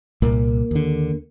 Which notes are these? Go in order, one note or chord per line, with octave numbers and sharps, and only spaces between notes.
C2 A#2 A#3
D#2 D3